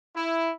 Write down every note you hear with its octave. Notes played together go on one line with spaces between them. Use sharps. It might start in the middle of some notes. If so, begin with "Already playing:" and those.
E4